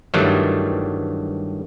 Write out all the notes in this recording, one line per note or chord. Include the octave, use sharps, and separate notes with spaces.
G2 D#3 E3 F#3 G3 A3